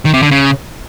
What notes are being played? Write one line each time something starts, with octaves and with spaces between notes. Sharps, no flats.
D#3
C3
D3
C#3